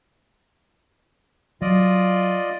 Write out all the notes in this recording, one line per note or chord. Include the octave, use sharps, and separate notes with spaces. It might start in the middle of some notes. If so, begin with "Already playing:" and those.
F#3 F4 D5 D#5